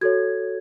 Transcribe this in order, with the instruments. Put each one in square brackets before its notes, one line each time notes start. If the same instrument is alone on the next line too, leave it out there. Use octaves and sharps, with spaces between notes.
[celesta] F#4 A4 C#5 G#6